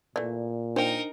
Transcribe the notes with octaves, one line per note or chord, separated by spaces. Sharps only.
A#2 E3 A3 D5
D4 D#4 A#4 C5 G5